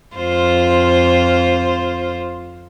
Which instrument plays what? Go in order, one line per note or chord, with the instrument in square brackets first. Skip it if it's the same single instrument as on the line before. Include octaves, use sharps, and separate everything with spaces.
[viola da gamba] F2 F4 C5